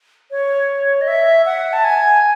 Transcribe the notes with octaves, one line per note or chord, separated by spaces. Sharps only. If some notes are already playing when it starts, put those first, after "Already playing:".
C#5
D#5
E5
F#5
A5
G#5